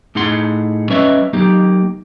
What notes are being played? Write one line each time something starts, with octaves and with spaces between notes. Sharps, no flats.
A2 D#4 G#4 F#5 C6
G3 C#4 B4 C#5 D#5 E5
F#3 A#3 D#4 G4